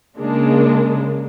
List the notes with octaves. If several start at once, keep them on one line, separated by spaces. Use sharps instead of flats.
C#3 G#3 A#3 D4